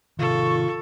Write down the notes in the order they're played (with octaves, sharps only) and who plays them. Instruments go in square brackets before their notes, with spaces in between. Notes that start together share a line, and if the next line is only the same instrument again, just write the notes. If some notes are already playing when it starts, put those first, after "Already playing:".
[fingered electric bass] C3 D#3 [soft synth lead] F4 [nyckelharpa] A4 [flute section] C#6